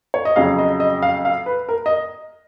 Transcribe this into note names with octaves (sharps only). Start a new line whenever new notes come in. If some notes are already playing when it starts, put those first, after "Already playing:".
C#5
D#5
F2 C#3 F#3 F5
D#5
D#5
F5
F5
B4
A#4
D#5